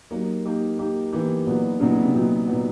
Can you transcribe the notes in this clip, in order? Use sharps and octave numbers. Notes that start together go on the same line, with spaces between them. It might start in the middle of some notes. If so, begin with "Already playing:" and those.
F#3 A#3 D#4 G4
A#3 D#4 G4
A#3 D#4 G4
E3 A#3 D#4 G4
A#2 F#3 B3 D#4 F#4
A#2 C#3 F#3 B3 D#4 F#4
C#3
C3
A#2 F#3 B3 D#4 F#4
A#2 F#3 B3 D#4 F#4